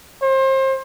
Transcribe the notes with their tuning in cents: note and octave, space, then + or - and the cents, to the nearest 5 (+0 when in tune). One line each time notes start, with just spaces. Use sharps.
C5 +30